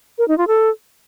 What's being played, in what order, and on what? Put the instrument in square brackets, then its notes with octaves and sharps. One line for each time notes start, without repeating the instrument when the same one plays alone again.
[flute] A#4
D#4
F4
A4